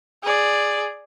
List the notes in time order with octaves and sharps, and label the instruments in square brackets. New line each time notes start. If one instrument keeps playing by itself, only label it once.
[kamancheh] G#4 D5